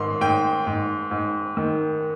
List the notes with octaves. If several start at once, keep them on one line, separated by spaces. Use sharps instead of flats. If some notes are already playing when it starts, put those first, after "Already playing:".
Already playing: G#2 D#3 C6
G#2 G5
G#2
G#2
D#3